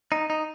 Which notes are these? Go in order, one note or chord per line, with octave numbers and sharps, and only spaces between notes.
D#4
D#4